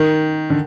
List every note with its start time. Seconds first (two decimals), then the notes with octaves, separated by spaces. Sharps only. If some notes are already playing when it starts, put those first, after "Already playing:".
Already playing: D#3
0.50 D3